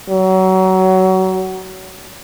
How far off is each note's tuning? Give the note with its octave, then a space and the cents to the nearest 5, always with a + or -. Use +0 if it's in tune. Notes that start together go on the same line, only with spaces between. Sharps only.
F#3 +25